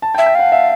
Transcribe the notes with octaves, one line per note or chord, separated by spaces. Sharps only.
A5
G5
E5
G5
F5 F#5
E5